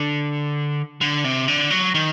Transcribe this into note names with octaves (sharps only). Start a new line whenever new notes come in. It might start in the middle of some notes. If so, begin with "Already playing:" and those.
Already playing: D3
D3
C3
D3
F#3
D#3